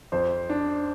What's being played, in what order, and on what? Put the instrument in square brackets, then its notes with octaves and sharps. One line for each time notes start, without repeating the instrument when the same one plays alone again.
[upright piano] F2 [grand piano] C5
[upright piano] D4